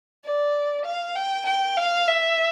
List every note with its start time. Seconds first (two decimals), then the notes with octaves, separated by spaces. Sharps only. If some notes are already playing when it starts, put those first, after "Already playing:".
0.24 D5
0.85 F5
1.16 G5
1.46 G5
1.77 F5
2.07 E5